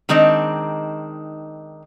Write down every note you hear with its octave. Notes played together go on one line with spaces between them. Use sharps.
D#3 G#3 C4 D4 D#4